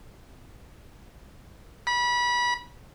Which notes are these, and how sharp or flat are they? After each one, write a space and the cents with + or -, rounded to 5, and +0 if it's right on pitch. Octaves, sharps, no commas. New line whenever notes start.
B5 -25